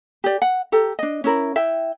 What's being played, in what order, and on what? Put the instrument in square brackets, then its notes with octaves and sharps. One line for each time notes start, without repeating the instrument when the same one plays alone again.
[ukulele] G4 D5
F#5
G4 A4 A#5
D4 D#5
C#4 E4 A#4 B5
E4 E5 G5